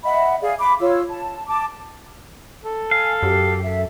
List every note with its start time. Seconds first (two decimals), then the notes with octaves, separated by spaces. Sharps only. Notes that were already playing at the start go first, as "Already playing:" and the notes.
0.04 D#5 E5 F#5 B5
0.41 G#4 D5 F5
0.59 B5 D6
0.80 F4 C#5 E6
1.09 A5
1.48 A5 D6
2.65 A4
2.91 F5 G#5
3.23 F#2 G4
3.63 A4 E5